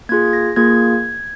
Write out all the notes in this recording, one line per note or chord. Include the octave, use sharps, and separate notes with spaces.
A#3 F4 G#4 G#6
A#6
A#3 F4 G#4 G#6